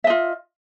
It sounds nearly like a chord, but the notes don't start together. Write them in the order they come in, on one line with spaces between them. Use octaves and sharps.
E5 D#5 F4